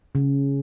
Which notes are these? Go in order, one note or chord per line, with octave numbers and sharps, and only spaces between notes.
C#3